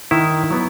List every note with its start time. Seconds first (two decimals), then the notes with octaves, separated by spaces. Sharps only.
0.11 D#3 E4
0.50 F#3 B3